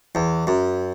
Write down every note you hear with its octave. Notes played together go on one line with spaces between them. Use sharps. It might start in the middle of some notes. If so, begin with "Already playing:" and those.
E2
F#2